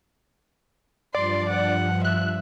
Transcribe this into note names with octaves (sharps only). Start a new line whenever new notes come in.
G2 F3 D5 C6
F#5
E5 F#6